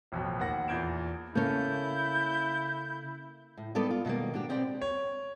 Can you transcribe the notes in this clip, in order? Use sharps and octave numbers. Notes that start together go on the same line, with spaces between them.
A1 F2 B2
D#2 A#3 F#5 A#6
E2 A#2 G6 G#6 D7 E7
C#3 A#3 C#4 E4 A4 G6
A2
G3 B3 D#4 A4 D5
F4
B2 D#3 F#3 G3 A#3
D4 F#4 G4
B2 C4 G4 D5 G5
C#5